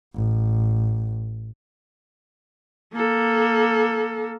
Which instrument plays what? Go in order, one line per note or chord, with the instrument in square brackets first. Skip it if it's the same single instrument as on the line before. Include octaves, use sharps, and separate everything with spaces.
[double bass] A1
[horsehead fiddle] A#3 A4